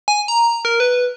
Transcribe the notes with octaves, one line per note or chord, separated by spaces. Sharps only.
G#5
A#5
A#4
B4